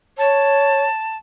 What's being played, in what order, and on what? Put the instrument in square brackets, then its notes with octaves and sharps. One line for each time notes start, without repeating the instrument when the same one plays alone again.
[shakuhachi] C#5 [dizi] A5